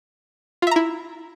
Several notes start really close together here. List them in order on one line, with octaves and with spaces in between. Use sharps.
F4 E5 A#5 E4